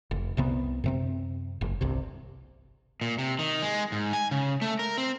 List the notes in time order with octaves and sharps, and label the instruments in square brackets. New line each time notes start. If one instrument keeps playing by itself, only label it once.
[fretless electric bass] F1
C2 C3 B3
F#2 C3 C4
F#1
G1 C2 C3
[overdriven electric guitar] A#2
C3
D#3
G#3
G#2
G#5
C#3
A3
A#4
C4